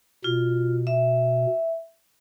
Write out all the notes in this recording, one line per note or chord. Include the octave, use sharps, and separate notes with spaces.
B2 F4
E5